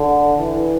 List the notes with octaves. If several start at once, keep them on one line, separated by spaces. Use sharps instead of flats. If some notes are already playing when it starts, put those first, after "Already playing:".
Already playing: D3
E3